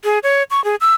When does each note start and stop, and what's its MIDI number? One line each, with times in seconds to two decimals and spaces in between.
0.04 0.19 68
0.23 0.43 73
0.51 0.63 85
0.64 0.75 68
0.81 0.95 88